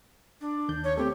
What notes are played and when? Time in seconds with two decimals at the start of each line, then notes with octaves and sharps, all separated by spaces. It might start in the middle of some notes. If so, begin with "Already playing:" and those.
0.41 D4
0.68 D#2 G6
0.84 C#5
0.97 A3 C4 G4